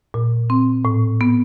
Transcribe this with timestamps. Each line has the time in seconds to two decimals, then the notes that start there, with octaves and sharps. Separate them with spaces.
0.14 A#2
0.50 C4
0.85 A2
1.21 B3